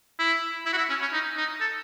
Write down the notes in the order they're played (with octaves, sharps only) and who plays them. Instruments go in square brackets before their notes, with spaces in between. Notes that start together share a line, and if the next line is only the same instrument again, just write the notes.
[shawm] E4
E4
F#4
E4
C#4
C#4
D#4
D#4
A4